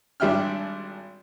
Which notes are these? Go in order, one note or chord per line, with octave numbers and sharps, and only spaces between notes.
G#1 G3 D4 E5 G5 F6